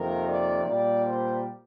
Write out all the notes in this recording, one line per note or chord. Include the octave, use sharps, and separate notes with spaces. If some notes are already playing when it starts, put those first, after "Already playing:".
Already playing: F2 C3 D#3 A#3 A#4
D5
A#2 G3 A#3 D5
C5